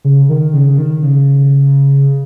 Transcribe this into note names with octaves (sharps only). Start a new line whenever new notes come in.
C#3
D#3
C#3
C#3
D#3
C#3